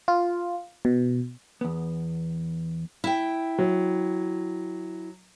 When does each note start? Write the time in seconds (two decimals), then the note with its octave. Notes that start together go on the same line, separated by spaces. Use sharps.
0.08 F4
0.85 B2
1.61 E2 B3
3.04 E4 G5
3.58 F#3